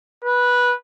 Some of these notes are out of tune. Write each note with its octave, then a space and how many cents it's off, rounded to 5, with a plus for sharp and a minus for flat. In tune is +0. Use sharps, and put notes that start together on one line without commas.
B4 -10